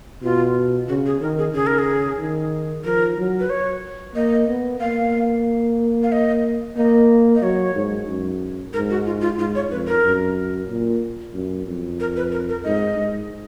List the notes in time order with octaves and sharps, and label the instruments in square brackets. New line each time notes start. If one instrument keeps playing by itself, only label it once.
[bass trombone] B2 [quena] F4
[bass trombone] C#3 [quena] F#4
[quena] G#4
[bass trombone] D#3 [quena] A#4
[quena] G#4
[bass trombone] C#3 [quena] G#4
[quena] A#4
G#4
[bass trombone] D#3
[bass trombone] F3 [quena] A#4
[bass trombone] F#3
[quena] B4
C#5
[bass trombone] A#3 [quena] D#5
[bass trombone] B3
[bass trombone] A#3 [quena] F5
[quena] F5
D#5
[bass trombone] A#3 [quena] D#5
[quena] D#5
[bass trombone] F#3 [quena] C#5
[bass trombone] G#2
F#2
[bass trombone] G#2 [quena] A#4
[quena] F#4
F4
F4
[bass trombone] G#2 [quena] F4
[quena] C#5
[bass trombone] F2 [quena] B4
[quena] A#4
[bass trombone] F#2
A#2
F#2
F2
[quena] A#4
B4
A#4
A#4
[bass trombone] G#2 [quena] D#5
[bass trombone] G#2